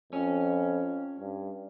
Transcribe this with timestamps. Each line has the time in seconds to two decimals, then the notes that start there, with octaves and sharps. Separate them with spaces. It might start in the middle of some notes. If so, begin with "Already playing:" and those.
0.13 F2 C#4
1.19 G2